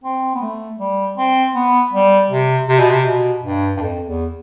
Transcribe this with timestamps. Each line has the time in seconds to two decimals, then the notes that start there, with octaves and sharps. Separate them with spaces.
0.04 C4
0.35 B3
0.42 A3
0.79 G3
1.17 C4
1.54 B3
1.92 G3
2.30 C3
2.68 C3
2.79 B2
2.90 C3
3.06 B2
3.43 G2
3.77 G2
3.82 F2
4.07 E2